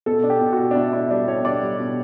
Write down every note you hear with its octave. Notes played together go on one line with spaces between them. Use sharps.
B2 A4
D4
G4
B2
F#4
B2
D4
B2 E4
D4 E4
G3 D4
B2 C#5
D4 D5
G3
B2